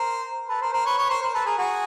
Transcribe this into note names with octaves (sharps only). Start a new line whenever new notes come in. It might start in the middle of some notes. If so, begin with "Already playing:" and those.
Already playing: A#4 C5
A4 B4
A#4 C5
A#4 C5
B4 C#5
B4 C#5
A#4 C5
A#4 C5
A4 B4
G#4 A#4
F#4 G#4